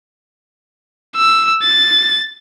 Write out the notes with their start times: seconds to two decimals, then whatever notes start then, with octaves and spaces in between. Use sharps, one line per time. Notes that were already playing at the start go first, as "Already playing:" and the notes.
1.17 E6
1.63 A6